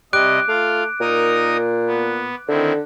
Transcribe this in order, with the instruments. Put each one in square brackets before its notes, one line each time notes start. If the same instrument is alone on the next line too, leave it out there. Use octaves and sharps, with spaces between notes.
[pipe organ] C3 D#5 [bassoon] G3 [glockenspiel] D6 F#6 D7
[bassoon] A3 [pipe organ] F4 F5
[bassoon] A#2 [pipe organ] D#4 A#4 D#6
[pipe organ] B3
[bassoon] D3 [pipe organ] D#3 C4 E4